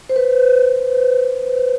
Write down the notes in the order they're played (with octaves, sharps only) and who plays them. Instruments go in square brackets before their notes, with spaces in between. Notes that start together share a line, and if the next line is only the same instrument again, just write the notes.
[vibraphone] C5
B4